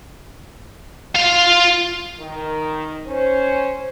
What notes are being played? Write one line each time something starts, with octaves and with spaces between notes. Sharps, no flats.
F4 F5
D#3
C#4 C5